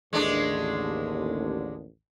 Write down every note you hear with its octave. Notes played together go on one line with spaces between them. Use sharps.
A1 D#2 D3 G#3 A3 D4